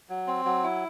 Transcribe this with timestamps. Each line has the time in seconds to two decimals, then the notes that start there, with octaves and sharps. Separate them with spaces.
0.09 F#3
0.27 C4
0.45 F#3
0.63 E4